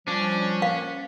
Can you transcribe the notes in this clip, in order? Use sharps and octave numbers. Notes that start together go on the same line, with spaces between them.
F3 G3 C#4 D4
A#3 F5